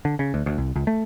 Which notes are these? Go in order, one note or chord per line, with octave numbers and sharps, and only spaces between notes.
D3
C#3
D2
D2
C2
C#2
A3